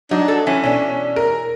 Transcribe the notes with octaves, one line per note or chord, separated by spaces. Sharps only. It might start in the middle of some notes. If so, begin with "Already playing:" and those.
F#3 D4 D#4
A4
E3 C#4
B2 C#4 D4
A#4